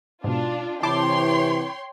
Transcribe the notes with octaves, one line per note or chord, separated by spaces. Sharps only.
G#2 B2 D4 F4
C3 E3 E4 C#5 G5 A5 C6 D6